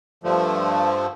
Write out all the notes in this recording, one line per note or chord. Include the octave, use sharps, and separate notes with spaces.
G2 D3 F3 A3